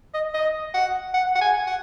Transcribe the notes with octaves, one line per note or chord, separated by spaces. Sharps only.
D#5
D#5
F#5
F#5
F#5
G#5
F#5